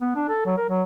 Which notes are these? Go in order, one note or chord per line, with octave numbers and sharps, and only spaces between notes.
B3
D4
A4
F#3
A#4
F#3